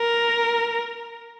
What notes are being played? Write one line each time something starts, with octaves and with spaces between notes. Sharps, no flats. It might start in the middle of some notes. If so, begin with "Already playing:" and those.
Already playing: A#4